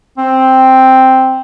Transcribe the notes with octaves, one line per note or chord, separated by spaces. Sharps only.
C4